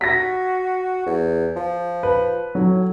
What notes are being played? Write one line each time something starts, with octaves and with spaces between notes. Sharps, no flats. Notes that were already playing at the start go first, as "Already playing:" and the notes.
F#4 A#6 B6
E2
F3
B4
A2 F#3